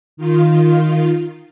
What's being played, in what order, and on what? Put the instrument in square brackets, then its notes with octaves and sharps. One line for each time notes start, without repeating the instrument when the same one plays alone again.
[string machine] D#3 F4